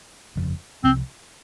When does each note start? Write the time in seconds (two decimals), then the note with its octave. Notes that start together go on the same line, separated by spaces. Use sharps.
0.36 G1 F2 C#3 F3
0.84 C2 C3 F3 C4